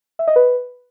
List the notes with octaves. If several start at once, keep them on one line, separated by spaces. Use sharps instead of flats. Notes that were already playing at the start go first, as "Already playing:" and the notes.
E5
D#5
B4